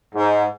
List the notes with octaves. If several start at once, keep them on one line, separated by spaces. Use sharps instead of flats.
G#2